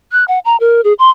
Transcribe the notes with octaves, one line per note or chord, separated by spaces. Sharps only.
F#6
F#5
A#5
A#4
G#4
C6